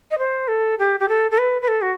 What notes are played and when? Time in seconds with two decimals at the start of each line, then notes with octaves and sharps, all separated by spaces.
0.11 D#5
0.18 C5
0.48 A4
0.79 G4
1.00 G4
1.09 A4
1.31 A4
1.38 B4
1.62 B4
1.68 A4
1.82 F#4